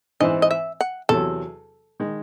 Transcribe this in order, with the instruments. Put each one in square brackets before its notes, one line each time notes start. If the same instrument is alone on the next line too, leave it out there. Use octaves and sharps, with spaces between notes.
[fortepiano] G#2 E3 C4 E4 C5 [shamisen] D#5
[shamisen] D#5
E5
F#5
[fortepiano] E2 C3 F#3 [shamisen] A4
[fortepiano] D#3 G#3